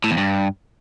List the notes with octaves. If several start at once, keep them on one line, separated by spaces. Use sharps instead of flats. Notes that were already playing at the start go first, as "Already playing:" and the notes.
A2
E2
G2